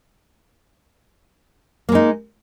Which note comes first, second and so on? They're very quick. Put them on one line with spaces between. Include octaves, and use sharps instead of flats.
A#3 G#3 D#4